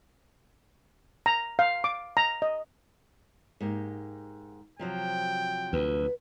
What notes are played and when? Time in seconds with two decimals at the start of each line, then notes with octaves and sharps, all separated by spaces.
1.26 A#5
1.59 F5
1.84 D6
2.17 A#5
2.42 D#5
3.60 G#2 A#3 G4
4.79 C3 F3 F#3 G5
5.73 D2 B4